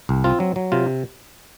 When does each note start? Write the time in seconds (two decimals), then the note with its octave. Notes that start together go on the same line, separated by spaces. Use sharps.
0.09 C2
0.24 C4 F4
0.40 F#3
0.56 F#3
0.72 C3 F4